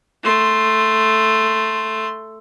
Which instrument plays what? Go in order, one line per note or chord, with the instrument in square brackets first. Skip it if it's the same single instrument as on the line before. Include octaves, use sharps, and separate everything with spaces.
[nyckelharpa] A3 C6